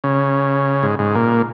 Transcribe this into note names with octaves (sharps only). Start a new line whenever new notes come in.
C#3
G#2
G#2
A#2